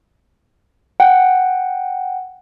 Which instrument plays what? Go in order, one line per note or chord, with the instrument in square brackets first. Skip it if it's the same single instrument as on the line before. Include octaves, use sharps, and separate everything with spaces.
[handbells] F#5 G5